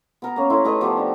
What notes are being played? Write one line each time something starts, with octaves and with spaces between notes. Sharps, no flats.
B3 A#4
A#3 C#4
A2 E4 C6
A3 D#4 G#4 B4
F3 B3 G4 C5
D4